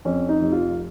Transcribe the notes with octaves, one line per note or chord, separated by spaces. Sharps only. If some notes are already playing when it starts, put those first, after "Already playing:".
F2 C#4
D#4
F1
F4